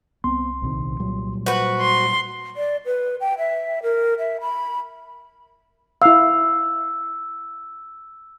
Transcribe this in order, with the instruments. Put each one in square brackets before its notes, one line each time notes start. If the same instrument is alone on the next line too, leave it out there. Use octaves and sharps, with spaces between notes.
[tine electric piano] C2 C6 [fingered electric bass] B3 C4
[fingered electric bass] A#1 C3 D#3
A#2 F#3 G3
[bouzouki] F#4 B4 [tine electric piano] C5
[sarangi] C6
[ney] D5
B4
G5
E5
A#4
E5
B5
[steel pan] E4 F5 [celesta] E6